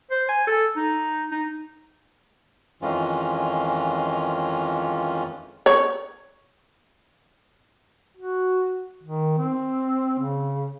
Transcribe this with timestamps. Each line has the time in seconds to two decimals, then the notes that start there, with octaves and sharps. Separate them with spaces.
0.10 C5
0.28 G#5
0.47 A4
0.76 D#4
1.31 D#4
2.82 F2 D#3 E3 G#3 C#4 F4
5.66 C#5
8.17 F#4
9.04 D#3
9.38 C4
10.19 C#3